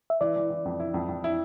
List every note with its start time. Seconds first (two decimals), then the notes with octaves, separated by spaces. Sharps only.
0.10 E5
0.21 E3 D5
0.36 E3
0.50 E3
0.65 F2
0.80 E4
0.94 F2
1.09 F2
1.24 E4